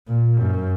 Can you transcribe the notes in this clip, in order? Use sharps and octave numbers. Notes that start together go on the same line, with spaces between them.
A#2
F#2